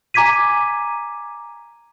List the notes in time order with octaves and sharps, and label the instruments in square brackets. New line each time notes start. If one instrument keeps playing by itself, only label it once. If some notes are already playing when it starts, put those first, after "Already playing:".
[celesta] G#5 A#5 D6 G#6 B6 D#7